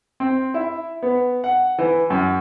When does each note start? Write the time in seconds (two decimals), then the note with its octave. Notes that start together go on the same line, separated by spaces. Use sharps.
0.20 C4
0.54 E4
1.03 B3
1.44 F#5
1.78 E3
2.10 F#2